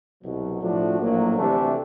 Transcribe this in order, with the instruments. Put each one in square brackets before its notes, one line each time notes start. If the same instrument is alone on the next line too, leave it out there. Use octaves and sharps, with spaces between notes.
[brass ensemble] C2 B2 F#3
A2 F3 A3 D4 F#4
A#1 A2 F#3 A#3
D2 C3 E3 A3 D4